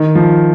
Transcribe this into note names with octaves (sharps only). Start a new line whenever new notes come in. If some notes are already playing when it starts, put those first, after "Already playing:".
Already playing: D#3
F3